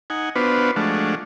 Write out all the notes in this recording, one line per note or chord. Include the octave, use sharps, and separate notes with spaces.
D#4 F#5 G#5
B3 D4 F4 F#4 B4 C5
F3 G#3 A3 D4 F#4